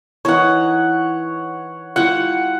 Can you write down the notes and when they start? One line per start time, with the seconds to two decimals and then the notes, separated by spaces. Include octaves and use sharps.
0.25 E3 D#4 C#5 F#5
1.96 G3 E4 F4 F#5